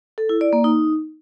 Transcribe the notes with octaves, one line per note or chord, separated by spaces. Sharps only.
A4
E4
D5
A#3
D#4